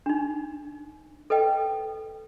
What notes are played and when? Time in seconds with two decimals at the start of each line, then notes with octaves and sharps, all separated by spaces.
0.06 D4 D#4
1.30 A4 B4 D#5 G5